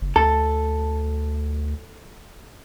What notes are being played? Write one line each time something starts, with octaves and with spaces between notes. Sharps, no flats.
F#1
D2 A4